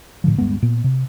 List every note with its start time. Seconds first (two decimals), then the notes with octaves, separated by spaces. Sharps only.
0.24 A2 D3 F3
0.38 D1 G2 G#3 B3
0.62 A#2 B3
0.84 C3